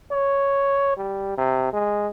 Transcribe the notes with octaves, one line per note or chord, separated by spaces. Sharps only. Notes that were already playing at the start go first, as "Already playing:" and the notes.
C#5
G3
C3
G#3